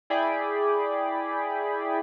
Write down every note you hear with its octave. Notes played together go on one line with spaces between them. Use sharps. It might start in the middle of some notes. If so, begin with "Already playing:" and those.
E4 G#4 D5 G5 B5 D6